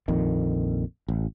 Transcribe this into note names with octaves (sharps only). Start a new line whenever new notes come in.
A#1 F2 A#2 D#3
A1